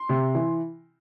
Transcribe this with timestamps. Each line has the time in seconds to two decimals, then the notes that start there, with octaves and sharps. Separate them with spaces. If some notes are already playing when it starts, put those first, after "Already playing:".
Already playing: C6
0.09 C3
0.35 E3